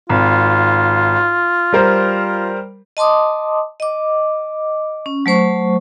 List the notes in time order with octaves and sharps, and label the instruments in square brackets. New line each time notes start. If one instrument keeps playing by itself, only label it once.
[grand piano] G#1 [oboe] F4
[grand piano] G3 A#4 C5
[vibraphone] D#5 A5 C6 D6 D#6
D#5 D6
C#4
F#3 A3 C5 C#6